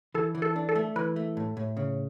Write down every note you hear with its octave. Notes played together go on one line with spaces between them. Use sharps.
E3 A4
E3
A4
D4
A4
A3
E3 B4
A3
A2
A2
C#3